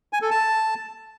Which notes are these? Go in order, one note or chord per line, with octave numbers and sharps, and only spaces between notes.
G#5
A4
A5